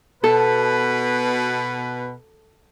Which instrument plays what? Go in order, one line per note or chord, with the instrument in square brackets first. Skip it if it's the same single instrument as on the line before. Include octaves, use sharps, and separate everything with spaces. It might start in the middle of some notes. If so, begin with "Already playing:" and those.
[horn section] B2 B4 [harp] A4